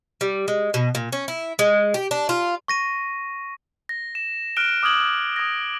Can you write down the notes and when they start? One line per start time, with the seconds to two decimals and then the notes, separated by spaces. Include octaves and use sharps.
0.21 G3
0.48 G#3
0.74 B2
0.95 A#2
1.12 C#4
1.28 E4
1.59 G#3
1.94 G4
2.11 D4
2.29 F4
2.68 C#6 A#6 D#7
3.89 A#6
4.15 E7
4.56 F6 F#6 D7 G7
4.83 D6 D#6 F6 G#6 F#7
5.36 D#6 G#6 A#6